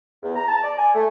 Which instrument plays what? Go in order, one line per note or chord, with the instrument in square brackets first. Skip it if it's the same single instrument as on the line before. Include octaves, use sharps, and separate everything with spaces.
[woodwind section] E2
A#5
A5
D5
G#5
A3